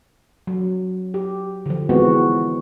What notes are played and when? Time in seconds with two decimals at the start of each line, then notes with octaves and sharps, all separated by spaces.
0.47 F#3
1.14 G4
1.66 D3 F3
1.89 E3 G#3 B3 C4 F#4